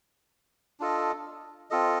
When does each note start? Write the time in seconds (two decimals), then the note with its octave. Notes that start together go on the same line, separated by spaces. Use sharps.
0.80 D4 F4 A4 D#5
1.70 C4 F4 A4 D#5